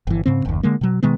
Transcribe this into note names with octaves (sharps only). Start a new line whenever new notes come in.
G1 E3
G#2 C#3 C4
F#1 D#2
D3 G#3 A#3
B2 F#3
B2 D#3 G#3 B3